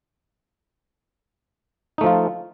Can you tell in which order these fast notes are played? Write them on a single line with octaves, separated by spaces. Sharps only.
D#4 A3 F3 F4